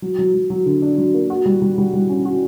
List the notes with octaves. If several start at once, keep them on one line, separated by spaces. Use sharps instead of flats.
F#3
F#3
F#3
F#3
D3
D4
F#3
A#3
F#4
G3
G3
G3
G3
C#4
F#4